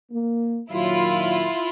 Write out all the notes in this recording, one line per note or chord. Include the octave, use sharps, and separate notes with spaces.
A#3
A#2 D#3 F#3 E4 F4